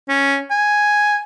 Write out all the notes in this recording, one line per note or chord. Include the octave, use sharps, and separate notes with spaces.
C#4
G#5